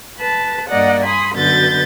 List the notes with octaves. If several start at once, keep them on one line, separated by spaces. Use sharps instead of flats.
B4 A5
G2 A#3 D5 D#5 F#5
G#5 B5 C6 D#6
F#2 B2 D3 B4 G6 A6